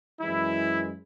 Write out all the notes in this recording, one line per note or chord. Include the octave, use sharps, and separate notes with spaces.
F#2 E3 G#3 E4